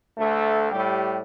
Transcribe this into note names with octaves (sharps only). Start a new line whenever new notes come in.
D2 A3
A2 G3 G4